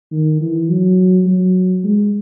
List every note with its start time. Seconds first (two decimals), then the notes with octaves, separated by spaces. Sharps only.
0.12 D#3
0.41 E3
0.69 F#3
1.26 F#3
1.84 G#3